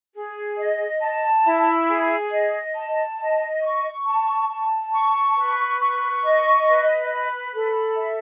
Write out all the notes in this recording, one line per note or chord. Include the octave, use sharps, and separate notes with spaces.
G#4
D#5
A5
E4
G#4
D#5
A5
D#5
C#6
A5
A5
C#6
B4
C#6
D#5
B4
B5
A4
E5